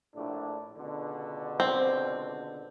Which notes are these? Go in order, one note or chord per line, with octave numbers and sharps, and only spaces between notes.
A#1 A2 D4
C#2 B2 D3
C4